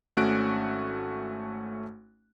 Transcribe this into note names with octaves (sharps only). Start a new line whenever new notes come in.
G#1 A3 C#4 F#4 F#6 D7